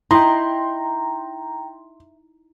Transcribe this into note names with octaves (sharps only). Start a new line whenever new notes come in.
D#4 E4 G5 A#5 C6